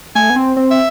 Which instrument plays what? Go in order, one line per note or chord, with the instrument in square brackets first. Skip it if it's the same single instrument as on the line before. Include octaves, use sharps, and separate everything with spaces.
[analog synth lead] A3 [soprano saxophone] G#5
[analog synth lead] B3
C4
C4
[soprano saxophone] E5